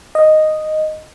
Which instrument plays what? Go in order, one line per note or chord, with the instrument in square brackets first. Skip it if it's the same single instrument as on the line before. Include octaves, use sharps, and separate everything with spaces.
[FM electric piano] D#5